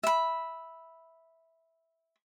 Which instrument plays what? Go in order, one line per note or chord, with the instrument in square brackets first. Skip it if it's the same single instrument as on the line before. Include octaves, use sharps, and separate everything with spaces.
[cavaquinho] E5 B5